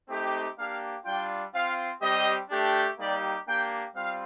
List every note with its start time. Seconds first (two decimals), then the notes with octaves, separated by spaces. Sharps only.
0.09 A3 C4 D#4 G4
0.57 A#3 D4 G4 F5
1.05 G3 D4 F4 G5
1.53 C4 F4 F5
2.01 G3 C4 G4 D#5
2.50 A3 D4 G4
2.98 G3 A#3 D#4 G4 D5
3.46 A#3 D4 G4 G5
3.95 G3 C4 F4 F5